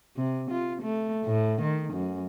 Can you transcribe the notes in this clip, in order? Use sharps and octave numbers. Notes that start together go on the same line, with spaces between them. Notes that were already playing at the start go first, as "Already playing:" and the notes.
C3
F4
A3
A2
D#3
F#2